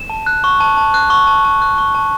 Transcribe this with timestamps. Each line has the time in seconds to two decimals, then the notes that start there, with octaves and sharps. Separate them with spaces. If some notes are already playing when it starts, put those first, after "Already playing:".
Already playing: E7
0.10 A5
0.26 F#6
0.44 C#6
0.60 A5
0.77 A5
0.94 F#6
1.10 C#6
1.27 A5
1.45 A5
1.62 F#6
1.78 C#6
1.95 A5